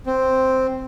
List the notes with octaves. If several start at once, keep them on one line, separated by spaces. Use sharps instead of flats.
C4